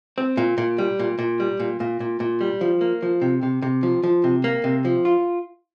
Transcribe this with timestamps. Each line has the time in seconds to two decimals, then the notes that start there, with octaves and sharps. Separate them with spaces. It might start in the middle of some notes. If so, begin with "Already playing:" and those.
0.18 C4
0.37 A#2
0.58 A#2
0.78 G3
0.99 A#2
1.19 A#2
1.40 G3
1.60 A#2
1.80 A#2
2.00 A#2
2.20 A#2
2.41 G3
2.61 F3
2.81 A#3
3.02 F3
3.22 C3
3.43 C3
3.62 C3
3.83 F3
4.03 F3
4.24 C3
4.44 A#3
4.64 C3
4.85 F3
5.05 F4